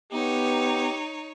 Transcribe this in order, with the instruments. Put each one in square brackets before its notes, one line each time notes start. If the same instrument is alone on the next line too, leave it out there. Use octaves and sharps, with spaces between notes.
[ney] B3 [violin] D#4 C#5 [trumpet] G4